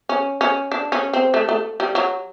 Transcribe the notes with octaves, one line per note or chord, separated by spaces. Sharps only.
C#4
C#4
D4
C#4
C4
A3
A3
G3
F#3